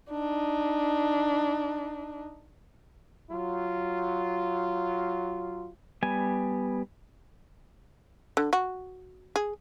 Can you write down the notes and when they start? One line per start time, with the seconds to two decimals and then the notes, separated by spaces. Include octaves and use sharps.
0.10 D4 D#4
3.31 F#3 F4
6.03 G3 B3 G#5
8.37 D3
8.53 F#4
9.36 G#4